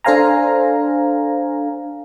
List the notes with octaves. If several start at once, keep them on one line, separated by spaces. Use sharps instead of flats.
D4 A4 C5 F5 G#5 A#5